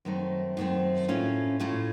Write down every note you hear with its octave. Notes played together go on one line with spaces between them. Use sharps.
F#2 D#3 A3 C4
F#2 D#3 A3 C4
A2 A3 C#4 F4
A2 A3 C#4 F4